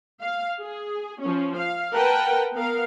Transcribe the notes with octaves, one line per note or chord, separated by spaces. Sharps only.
F5
G#4
F3 C#4
F5
A#4 B4 F#5 G5 A5
B3 A#4 F5